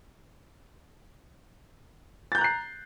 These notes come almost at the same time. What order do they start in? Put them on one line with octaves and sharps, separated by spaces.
A6 G6 A#5 F#6 C7